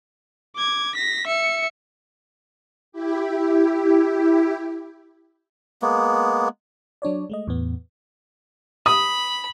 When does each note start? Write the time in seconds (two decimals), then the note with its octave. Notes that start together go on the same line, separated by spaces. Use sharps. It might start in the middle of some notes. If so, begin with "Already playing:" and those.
0.56 D6 G#6
0.95 A#6 B6
1.27 E5 C#7
2.92 E4 G4
5.82 G#3 A#3 B3
7.02 F#3 D4 C#5 D5
7.30 G#3 A3 D#5
7.48 E2 A2 B3
8.86 B5 D#6